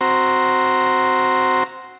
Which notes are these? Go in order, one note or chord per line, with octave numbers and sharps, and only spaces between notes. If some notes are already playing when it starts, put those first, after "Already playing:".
C4 F#4 A#5 C6